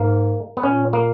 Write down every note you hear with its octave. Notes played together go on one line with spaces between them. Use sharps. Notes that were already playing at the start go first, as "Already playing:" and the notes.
Already playing: G#2 A#3
B3
A#2 C#4
A#3